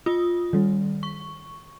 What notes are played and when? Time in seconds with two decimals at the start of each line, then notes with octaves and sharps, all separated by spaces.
0.06 F4 D#6
0.53 D#3 G3
1.03 C#6